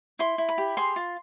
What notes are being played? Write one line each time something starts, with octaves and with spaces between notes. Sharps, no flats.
E4 C6
E4
B5
G4
G#4 C6
F4